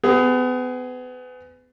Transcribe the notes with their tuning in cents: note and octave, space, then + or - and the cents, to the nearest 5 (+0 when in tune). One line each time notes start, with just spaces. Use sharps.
B3 +30 G#4 +0